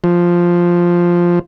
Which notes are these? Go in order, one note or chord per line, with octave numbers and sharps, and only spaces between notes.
F3